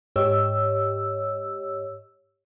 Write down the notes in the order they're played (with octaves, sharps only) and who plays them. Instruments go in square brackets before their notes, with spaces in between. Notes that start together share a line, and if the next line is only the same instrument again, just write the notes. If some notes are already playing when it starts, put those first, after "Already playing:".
[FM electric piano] G#2 G4 C#5 D#5 E6